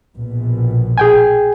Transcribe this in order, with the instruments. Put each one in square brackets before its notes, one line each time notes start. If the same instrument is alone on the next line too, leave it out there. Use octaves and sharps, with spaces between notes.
[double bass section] A#1 B2
[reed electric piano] G#4 G5 G#5